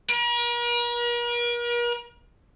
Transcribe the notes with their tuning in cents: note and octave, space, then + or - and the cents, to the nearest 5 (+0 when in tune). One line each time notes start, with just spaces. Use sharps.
A#4 +45